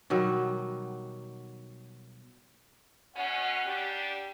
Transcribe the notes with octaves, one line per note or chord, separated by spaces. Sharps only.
B2 D#3 F#3 G3
B2 C#4 F#5
G3 D4 G4